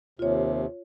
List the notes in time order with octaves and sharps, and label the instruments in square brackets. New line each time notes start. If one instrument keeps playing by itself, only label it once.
[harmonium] D#2 C3 [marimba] F4 C#5